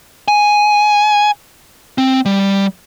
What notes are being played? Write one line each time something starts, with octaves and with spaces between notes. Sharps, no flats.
G#5
C4
G3